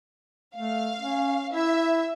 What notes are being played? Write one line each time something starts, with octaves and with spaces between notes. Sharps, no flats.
A3 F5
C#4
E4 E5